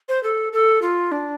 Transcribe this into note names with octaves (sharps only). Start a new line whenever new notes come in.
C5
A4
A4
F4
D4